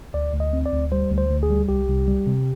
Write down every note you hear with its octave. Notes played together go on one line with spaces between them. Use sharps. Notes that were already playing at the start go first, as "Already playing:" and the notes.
D2 D5
D2
D#5
C4
D5
D2
G3 C5
D2
C5
D2
G#4
G3
C2 G4
C2
G3
C3